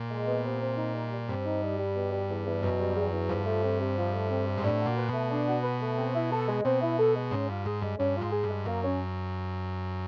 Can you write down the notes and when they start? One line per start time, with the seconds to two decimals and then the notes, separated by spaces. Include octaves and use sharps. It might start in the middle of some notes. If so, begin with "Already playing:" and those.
Already playing: A#2
0.11 G#3
0.27 B3
0.45 C3
0.61 C4
0.77 D#4
0.94 G3
1.12 G3
1.28 G2 C4
1.45 D#4
1.62 G3
1.78 G3
1.95 B2
2.12 G3
2.28 E2
2.46 E2
2.63 F#2 B2
2.79 G3
2.96 E2
3.12 E2
3.29 G2 F3
3.46 A3
3.63 C4
3.80 C3
3.97 F3
4.13 A3
4.31 C4
4.47 C3
4.57 G#2
4.64 A2 D4
4.81 F#4
4.86 A#2
4.97 B4
5.08 B2 A3
5.31 D4
5.48 F#4
5.64 B4
5.80 A3
5.97 C4
6.15 E4
6.32 A4
6.48 G#3
6.64 B2 C4
6.82 E4
6.98 A4
7.15 G#3
7.31 G#2 C#4
7.48 G2 F4
7.65 G#2 G#4
7.82 G2 G#3
7.99 G2 C#4
8.16 F4
8.21 G#2
8.32 G#4
8.43 G2
8.49 G#3
8.65 F#2 A#3
8.83 C#4